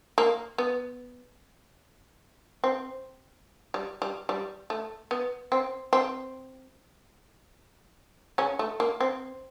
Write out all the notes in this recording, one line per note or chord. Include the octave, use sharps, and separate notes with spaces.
A#3
B3
C4
G3
G3
G3
A3
B3
C4
C4
C#3 C#4
A3
A#3
C4